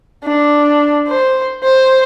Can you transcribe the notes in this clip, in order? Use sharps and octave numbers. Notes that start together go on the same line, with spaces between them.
D4
C5
C5